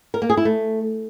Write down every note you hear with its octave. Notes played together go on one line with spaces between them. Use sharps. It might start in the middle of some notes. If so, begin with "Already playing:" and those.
A#4
A#3
G#4
E4
A3